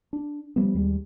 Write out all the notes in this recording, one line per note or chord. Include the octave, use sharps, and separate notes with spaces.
D4
F3 G3 B3
D#2 G3 G#3